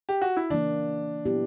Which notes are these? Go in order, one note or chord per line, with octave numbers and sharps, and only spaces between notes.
G4
F#4
E4
C#3 E3 A#3 D4
A#2 F#3 B3 E4 G4